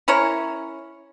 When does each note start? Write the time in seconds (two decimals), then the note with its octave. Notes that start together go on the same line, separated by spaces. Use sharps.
0.08 C#4 E4 A#4 C#5